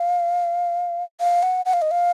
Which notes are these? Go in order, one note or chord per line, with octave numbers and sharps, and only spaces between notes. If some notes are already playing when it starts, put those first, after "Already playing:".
Already playing: F5
F5
F#5
F#5
F5
D#5
F5